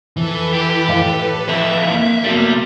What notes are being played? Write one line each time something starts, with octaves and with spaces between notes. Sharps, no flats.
F2 E3 A4 B4
G4
A2 F5
F2 E3 E5
A#3 F5
C3 F#3 G3 A3 B3